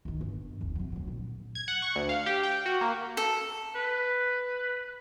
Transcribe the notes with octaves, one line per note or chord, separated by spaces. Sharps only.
G1 D#3
G1
F1 D2
C3 F#3
D2 F#3
A#1
G#6
F#5
C#6
D2
F5
G4
G5
F#4
A#3
A4
B4